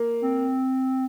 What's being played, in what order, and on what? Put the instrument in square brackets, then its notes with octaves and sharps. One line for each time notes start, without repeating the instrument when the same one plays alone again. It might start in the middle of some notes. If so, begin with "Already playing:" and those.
Already playing: [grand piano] A#3
[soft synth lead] C4